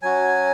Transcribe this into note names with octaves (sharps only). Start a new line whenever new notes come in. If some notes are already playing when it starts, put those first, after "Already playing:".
F#3 C#4 F#4 G#5